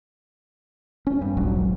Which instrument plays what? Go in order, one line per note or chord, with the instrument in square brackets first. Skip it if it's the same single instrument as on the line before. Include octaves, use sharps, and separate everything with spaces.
[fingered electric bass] C#4
G2
D#1 A#1 G#2 F#3